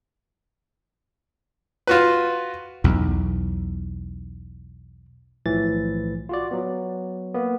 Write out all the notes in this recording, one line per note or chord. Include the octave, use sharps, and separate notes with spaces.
F4 F#4 B4
B1 E2
B1 A2 E3 F3 A6
F4 F#4 D5
F#3 B3
A#3 B3